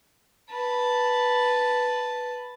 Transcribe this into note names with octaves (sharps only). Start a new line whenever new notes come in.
B4 A5